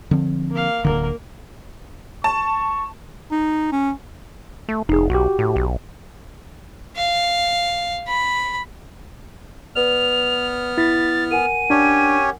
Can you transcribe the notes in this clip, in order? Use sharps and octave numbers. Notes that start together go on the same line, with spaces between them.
D3 F3 C4
A#3 F5
D1 B1 D3 A#3 A#4
A5 C#6
D#4
C#4
A3
F1 D#4 G#4
B1 F#4 G4
A2
B1
F5
B5
B3 B4 D5 F6 F7
E4 A6 B6
A#4 F#5 G#5 D#7
C#4 D4 G4 C#5